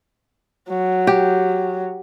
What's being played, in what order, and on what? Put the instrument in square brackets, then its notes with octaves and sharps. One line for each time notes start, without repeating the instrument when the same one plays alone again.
[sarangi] F#3
[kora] G4